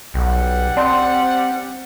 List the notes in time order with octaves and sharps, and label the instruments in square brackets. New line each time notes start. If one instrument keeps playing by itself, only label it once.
[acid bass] B1 [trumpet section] G3 F#5
[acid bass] C4 [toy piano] D5 A5 C6